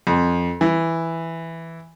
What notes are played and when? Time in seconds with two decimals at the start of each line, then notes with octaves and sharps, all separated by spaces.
0.07 F2
0.61 E3